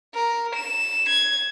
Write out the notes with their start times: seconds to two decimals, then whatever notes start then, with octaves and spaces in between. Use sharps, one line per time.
0.14 A#4
0.55 E7
1.08 G#6